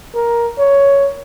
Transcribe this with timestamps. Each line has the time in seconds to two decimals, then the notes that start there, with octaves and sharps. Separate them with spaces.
0.15 A#4
0.58 C#5